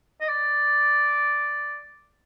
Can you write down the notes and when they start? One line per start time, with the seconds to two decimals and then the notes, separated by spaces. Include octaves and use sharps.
0.20 D#5
0.28 D5